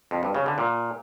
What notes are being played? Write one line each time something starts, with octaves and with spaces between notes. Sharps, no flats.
F2
G2
C#3
D3
A#2